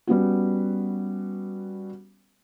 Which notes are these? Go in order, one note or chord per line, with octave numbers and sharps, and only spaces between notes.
G3 B3 C#4 F#4